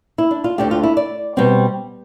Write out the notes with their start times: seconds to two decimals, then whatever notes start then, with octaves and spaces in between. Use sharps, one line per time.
0.18 E4
0.31 D4
0.44 F4
0.58 D2 D3 A3 G4
0.71 F4
0.83 E4
0.97 D5
1.37 B2 G3 C4